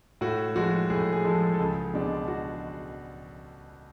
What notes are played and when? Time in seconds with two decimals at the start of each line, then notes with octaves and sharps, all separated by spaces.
0.21 A2 F#4
0.55 F3 G#3 F#4
0.90 A2 G#4
1.13 G#4
1.25 F3 G#3 A4
1.54 A4
1.59 C#2 G#4
1.94 B2 G#3 D4
2.28 F#4